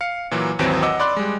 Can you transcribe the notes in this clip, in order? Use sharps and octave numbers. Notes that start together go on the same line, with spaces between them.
F5 C#7
A#2 E3 F#3 A#3
G#1 D#2 E3 F#3 C4 D7
D#5 F#5 D6 E6
D5 B5 C6 D6 F#6
G3 G#3